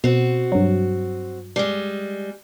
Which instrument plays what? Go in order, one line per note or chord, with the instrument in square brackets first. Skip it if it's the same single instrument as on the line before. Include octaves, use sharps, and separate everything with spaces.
[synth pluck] B2 [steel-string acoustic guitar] C4 F#4
[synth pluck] G2 F#3
[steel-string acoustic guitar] G3 G#3